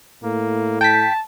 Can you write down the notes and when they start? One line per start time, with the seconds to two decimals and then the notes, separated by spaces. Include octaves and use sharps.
0.24 A2 A#3
0.81 G5 A5 B6